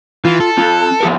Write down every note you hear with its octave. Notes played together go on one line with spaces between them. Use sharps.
E3 F4
A4
C4 F4
F3 G4 A#4